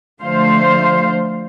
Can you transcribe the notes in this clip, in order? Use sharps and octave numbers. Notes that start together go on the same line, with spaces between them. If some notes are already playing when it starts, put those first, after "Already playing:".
D3 F3 A3 C5 F5